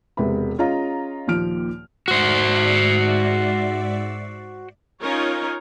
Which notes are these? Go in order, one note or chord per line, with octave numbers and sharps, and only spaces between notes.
E1 C3 G#3 B4 E5 B5
C#4 F4 G#4 D#5 F5 A#5
D#2 A#2 D#3 F3 F6 D7
G#2 F#4 C5 D5 E5
C#4 D#4 F4 A#4 C#5